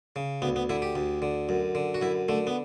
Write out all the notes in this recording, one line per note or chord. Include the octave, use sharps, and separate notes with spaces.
C#3
D2 B3
B3
D3 E4
G4
D2
D3
F#2
D3
F#4
F#2 E4
D3 A3
B3